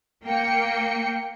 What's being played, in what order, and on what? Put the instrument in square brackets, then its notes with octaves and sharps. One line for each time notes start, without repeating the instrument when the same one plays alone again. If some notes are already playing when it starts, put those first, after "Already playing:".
[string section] A#3 G5 C#7